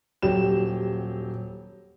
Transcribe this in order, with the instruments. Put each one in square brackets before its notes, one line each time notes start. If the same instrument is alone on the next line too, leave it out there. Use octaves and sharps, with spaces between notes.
[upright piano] D#1 F#3 G4 E7